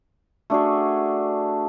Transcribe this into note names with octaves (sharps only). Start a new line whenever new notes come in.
A3 D4 F#4 G#4